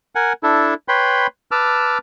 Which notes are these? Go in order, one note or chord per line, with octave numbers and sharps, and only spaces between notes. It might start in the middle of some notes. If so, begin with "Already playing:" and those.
A#4 F#5 G#5
D4 E4 A4
B4 C#5 G5 B5 C6
B4 A5 D6 E6 F6